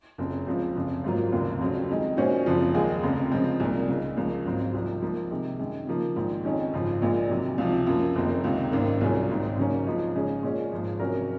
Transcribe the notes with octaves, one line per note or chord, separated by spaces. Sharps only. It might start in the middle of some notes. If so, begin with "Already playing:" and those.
F#1 F2 C#3
C#2 C#3 F3 C4
F#1 F2 C#3 F3
G#1 G#2 F#3 A#3 F4
F1 D#2 C#3
F2 C#3 F#3 C4
F2 D#3 G#3
A#2 G#3 C#4 F#4 C5
F#1 F2 C#3 F3
D#2 D#3 G#3 D#4 G#4
F1 F2 C#3
C#3 F3 G#3 C4
C2 A#2 G#3 D#4
C#2 C#3 G#3
C#2 C#3 F3 A#3
G#1 G#2 F#3 C4
C2 C3 F3
G#2 F3 A#3
C3 D#3 G#3
F#2 D#3 G#3
C#3 F3 A#3
A#1 G#2 D#3
F2 D#3 G#3 C#4
G#1 F#2 C#3 F3
A#1 A#2 G#3
C3 D#3 F#3
C#2 C3 F3
F#2 F3 A#3
F#1 F2 D#3 A#3 D#4
C#2 C3 D#3
G#1 F#2 D#3 A#3
C2 A#2 F#3 C#4 G#4
G#1 G#2 D#3
C#3 F#3 A#3 C#4
G#1 G#2 F3 G#3
C#3 G#3 C#4 G#4
A#2 G#3 C#4 G#4
G#1 G#2 F3
C3 F#3 C#4 F#4 A#4